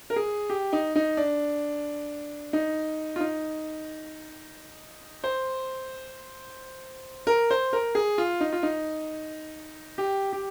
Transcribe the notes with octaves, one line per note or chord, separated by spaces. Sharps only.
A#4
G#4
G4
D#4
D#4
D4
D#4
F4
D#4
C5
A#4
C5
A#4
G#4
F4
D#4
F4
D#4
G4
G4